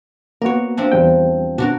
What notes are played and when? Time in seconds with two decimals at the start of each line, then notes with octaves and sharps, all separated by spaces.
0.42 A#3 B3 F#4 A#4 C#5
0.77 F3 C4 D4
0.92 E2 G3 G5
1.58 B2 D4 F#4 A#4